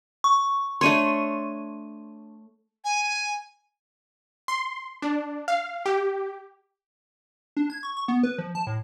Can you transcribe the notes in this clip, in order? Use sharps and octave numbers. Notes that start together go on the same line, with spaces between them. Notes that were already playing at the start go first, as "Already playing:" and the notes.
C#6
A3 D4 C#5 C6 D#7
G#5
C6
D4
F5
G4
D4
G#6
C#6
C#6
B3
B4
F3
A5
A2